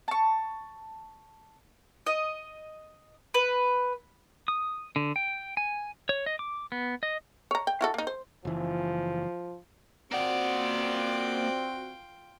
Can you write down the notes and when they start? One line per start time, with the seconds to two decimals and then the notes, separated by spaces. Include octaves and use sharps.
0.08 A5 C#6
2.07 D#5
3.34 B4
4.48 D#6
4.96 D3
5.16 G5
5.57 G#5
6.09 C#5
6.26 D#5
6.39 D6
6.72 B3
7.03 D#5
7.51 C#5 A#5
7.67 G5
7.81 E4 F#4 A4
7.94 A#3 D#4
8.07 C5
8.45 F#1 E3 F3
10.12 A#3 C4 F4 F#4 D5 F#5 G5